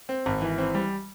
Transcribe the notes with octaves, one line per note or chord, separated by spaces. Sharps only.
C4
G#1
E3
C4
G3